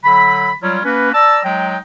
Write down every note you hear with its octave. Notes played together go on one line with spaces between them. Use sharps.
D3 F#3 B5
F#3 G3 C#4 F4
A#3 C#4 F#4 B4
D5 A5 A#5 E6
F#3 G#3 D#4 G5